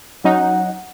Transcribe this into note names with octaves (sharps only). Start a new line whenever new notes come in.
F#3 C#4 D#4 F#5